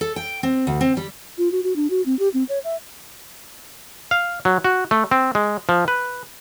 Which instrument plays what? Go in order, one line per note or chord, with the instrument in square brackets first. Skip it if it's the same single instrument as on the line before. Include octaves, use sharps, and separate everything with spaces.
[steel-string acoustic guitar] A4
G5
C4
D2
C4
G3
[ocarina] F4
F#4
F#4
D4
F#4
C4
G4
C4
C#5
E5
[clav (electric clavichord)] F5
F#3
F#4
A3
C4
G#3
F3
B4